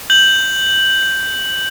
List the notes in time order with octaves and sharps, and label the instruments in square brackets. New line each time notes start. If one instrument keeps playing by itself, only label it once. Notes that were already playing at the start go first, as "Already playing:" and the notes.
[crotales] G6 F#7